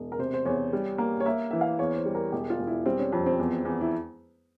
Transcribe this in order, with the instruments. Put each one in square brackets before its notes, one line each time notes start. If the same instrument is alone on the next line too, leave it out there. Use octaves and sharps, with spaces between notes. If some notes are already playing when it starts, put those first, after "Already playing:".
Already playing: [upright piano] E1
A#4
C3 C5
C5
E2 C#5
G3
A#3
C#5
A#3 E5
E3 E5
F5
E2 C#5
C5
G3
A#4
E1 G4
F4
E1
E4
G3 C4
C#4
F2
C4
E2
E2
E4